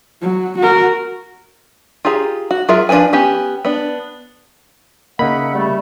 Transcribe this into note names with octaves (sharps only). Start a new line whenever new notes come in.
F#3
F#4 A#4
F4 G4 G#4 A#5
F#4
F#3 F4 G#4 A#4 E5
F3 D4 A#4 B4 G#5
B3 C#4 G4 G#5
B3 D4
C#3 A#3 D#4 E5 F#5 B5
G3 A3